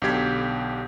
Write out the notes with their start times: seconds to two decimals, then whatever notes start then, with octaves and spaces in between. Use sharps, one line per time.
0.02 B1 B2 D3 G4 G#6 B6